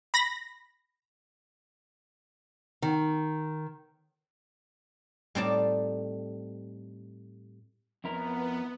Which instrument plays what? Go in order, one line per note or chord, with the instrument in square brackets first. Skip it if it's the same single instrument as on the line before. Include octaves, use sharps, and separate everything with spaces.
[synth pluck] B5 A#6
[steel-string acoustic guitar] D#3
[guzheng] A2 G3 C4 D#4 D5 A5
[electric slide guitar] F2 E4 A#4 [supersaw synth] B3